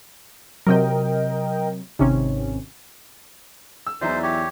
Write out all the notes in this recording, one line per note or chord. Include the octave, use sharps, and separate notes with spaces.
C3 F#3 A#4 D#5 G5
G#1 C3 D#3 C#4
E6
E2 E3 F#3 D#4 C5 D5 E5
G4 C#5